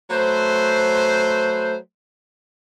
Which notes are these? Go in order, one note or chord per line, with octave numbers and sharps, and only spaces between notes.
F#3 A3 B4 C5